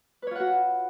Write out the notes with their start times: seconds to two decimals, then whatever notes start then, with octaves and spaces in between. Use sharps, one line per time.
0.22 B4
0.27 C#5
0.31 F4
0.35 F#5
0.40 F#4